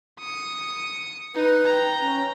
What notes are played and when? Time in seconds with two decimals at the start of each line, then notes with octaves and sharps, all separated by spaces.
0.20 D#6 C#7
1.35 D#4 B4
1.65 G5 A#5
2.00 C#4